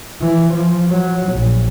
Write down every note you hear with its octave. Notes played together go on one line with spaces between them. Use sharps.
E3
F3
F#3
A#1